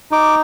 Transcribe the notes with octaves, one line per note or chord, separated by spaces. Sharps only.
D#4 D6